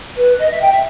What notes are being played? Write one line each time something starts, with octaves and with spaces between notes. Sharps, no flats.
B4
D#5
E5
G5
E5